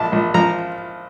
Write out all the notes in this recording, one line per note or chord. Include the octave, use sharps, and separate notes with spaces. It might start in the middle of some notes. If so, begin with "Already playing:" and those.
Already playing: A#1 A5
A#1
F3 A#5